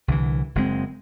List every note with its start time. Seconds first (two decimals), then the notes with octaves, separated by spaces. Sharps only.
0.08 C2 D3 E3
0.55 F#1 G#3 C4